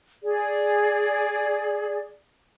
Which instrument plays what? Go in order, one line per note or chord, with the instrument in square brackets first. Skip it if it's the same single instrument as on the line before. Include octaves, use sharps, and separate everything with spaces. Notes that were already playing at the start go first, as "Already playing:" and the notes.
[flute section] G#4 D5